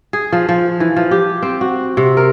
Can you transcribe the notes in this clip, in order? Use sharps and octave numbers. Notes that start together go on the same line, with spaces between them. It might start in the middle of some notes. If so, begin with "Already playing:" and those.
G#4
F3
F3
E3
F3
G4
C4
F#4
C3
A#4